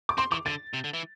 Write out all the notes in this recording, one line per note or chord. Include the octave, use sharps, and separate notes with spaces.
D6
C4 C6
E3 D6
D3 A6
C3
D3
E3